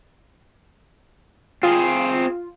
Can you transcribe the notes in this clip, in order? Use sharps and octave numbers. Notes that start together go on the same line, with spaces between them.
C4 F4 G#4